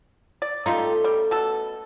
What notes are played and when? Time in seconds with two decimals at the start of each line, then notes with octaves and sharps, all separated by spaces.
0.42 D5
0.66 A3 C#4 D#4 F4 G4
1.04 G3
1.31 B2 A4